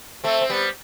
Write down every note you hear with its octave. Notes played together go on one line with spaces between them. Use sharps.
A3 C4
C4
G3 B3